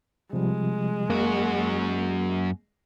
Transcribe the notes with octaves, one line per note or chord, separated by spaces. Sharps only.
C3 F3 G3 G#3
F#2 A#3 F#4